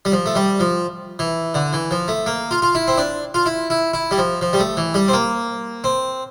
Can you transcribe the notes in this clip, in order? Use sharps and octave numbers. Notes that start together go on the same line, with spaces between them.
G3
F3
A3
G3
F3
E3
D3
E3
F3
A3
A#3
F4
F4
E4
C4
D4
F4
E4
E4
E4
G3
F3
F3
G3
A3
E3
G3
C4
A#3
C4